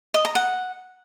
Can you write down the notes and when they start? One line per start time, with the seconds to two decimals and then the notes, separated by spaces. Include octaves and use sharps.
0.14 D#5
0.25 A#5
0.35 F#5